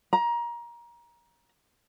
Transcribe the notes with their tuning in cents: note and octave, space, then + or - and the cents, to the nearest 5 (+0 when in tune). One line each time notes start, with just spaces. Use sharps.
A#5 +25